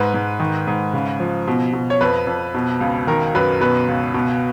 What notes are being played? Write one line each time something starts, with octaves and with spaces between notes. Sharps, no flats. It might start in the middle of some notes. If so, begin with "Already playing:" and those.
Already playing: G#2 B4
G#2
D#3
G#2
C#3
F3
B2
B2
C#5
F2 B4
F2
B2
C#2
D#3 A#4
F#2 B4
B2 B4
C#2
B2